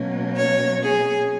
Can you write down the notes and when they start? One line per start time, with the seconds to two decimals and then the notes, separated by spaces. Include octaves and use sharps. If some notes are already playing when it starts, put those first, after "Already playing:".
Already playing: B2 F#3 A#3 C#4
0.37 C#5
0.82 G#4